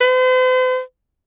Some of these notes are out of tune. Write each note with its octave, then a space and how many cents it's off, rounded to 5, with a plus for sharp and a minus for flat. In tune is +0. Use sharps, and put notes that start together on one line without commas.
C5 -45